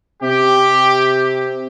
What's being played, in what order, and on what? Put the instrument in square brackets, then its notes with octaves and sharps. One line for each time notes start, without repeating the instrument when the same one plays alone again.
[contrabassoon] C3 [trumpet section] G4